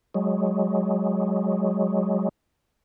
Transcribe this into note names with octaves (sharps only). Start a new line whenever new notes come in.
F#3 G#3